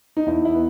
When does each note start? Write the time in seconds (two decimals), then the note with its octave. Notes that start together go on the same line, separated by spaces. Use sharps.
0.17 D#4
0.26 E2 E4
0.45 E4
0.54 B3